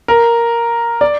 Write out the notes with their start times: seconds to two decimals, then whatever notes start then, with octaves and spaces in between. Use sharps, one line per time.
0.08 A#4
1.01 D5